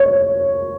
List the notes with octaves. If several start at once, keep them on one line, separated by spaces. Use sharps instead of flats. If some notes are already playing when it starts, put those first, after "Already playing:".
Already playing: C#5